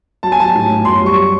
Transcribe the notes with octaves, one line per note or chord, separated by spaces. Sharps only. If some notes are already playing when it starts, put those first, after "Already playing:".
F#3 A5
G#5
F#3 A5
A2
A2
F#2 C6
G3 C#6